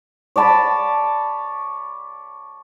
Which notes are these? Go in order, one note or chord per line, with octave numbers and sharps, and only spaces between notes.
C#5 D5 A5 B5